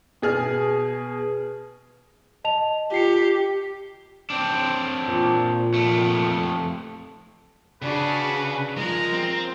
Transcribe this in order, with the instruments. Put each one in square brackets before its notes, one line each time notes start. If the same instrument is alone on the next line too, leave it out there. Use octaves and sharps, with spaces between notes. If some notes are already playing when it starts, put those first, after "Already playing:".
[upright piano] B2 G#4 F6
[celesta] D#5 A5 F7
[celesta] F4 C7 C#7 [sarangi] G4
[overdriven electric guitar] C4 D4
[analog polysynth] A#2
[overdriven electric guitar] F2 A3
[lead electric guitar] C#3 [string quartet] D4 F#4 G#4 [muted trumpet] B4
[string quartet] F3 A#4 [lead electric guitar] G#3 [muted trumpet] A#5
[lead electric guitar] C4